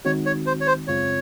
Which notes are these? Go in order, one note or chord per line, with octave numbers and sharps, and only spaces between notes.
D#3 G#3 C4 D#4 F#4 C#5
C#5
C5
C#5
C5
F#2 C#3 G#3 C4 F4 C#5